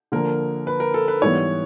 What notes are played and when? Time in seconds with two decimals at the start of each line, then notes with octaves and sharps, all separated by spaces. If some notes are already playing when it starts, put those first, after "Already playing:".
0.12 D3 F3 A#3 A#4
0.67 B4
0.80 A#4
0.94 A4
1.08 B4
1.22 G#2 E3 G3 B3 C#5